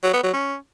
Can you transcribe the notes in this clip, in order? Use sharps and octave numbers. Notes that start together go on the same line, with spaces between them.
F#3
B3
F#3
C#4